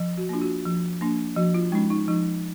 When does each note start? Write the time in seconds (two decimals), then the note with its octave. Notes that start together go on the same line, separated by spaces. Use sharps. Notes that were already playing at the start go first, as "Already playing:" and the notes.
Already playing: F3
0.17 F#4
0.29 A#3 D4 F4
0.42 F#4
0.65 F3
1.01 A#3 D4
1.36 F3 F#4
1.54 F4
1.72 G#3 C#4 D#4
1.90 D#4
2.08 F3 D#4